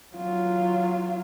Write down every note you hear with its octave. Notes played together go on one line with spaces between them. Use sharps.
F#3 F4